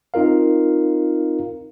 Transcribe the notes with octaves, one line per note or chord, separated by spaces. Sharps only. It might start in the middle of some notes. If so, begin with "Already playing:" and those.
C4 D#4 F4 A#4 F5